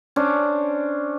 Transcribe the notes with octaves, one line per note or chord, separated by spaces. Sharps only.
C#4 D4 C5